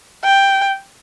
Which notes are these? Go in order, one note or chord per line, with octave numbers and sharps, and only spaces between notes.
G5